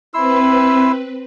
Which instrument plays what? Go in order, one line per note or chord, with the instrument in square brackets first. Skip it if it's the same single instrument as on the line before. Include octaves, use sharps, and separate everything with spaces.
[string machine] C4 B4 [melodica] E4 C6 E6